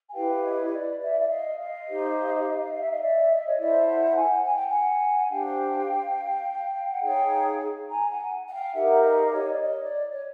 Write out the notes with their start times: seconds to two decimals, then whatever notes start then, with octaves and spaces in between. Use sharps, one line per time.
0.09 G#5
0.14 E4 G4 B4 F5 G5
0.43 C#5 D#5
0.72 D5
1.00 D5 E5
1.20 E5
1.29 D#5 F5
1.57 D#5 F5
1.86 D#4 G4 C5
2.72 F5
2.81 E5
2.90 D#5 F5
3.01 D5 E5
3.29 D#5
3.38 E5
3.46 C#5 D#5
3.57 E4 A4 C5 D5 E5
3.87 E5 F#5
4.15 F#5 G#5
4.44 G#5
4.55 G5
4.66 F#5 G#5
5.29 D4 G4 C5 F5 G5
6.90 F#5
7.01 D#4 G#4 C#5 F5 G5
7.88 G#5 A#5
8.08 F#5 G#5
8.47 F#5
8.51 F5 G5
8.73 D#4 G4 A#4 E5 F#5
9.02 D#5 F5
9.30 C#5 D#5
9.51 D5
9.59 C#5 D#5
9.81 D5
10.12 C#5